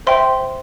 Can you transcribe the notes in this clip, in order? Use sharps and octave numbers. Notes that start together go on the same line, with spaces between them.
C5 E5 G5 C6